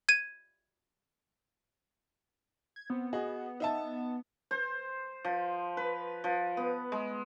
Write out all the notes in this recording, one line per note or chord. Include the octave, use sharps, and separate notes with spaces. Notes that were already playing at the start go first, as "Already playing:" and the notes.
G#6 D#7
G#6
B3 C4
F#4 G#4 D#5
D#4 E5 A5
C5
F3
B4
F3
B3
G#3